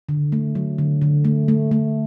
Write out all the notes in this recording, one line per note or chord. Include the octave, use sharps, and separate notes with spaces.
D3
A3
F#3
D3
D3
A3
A3
A3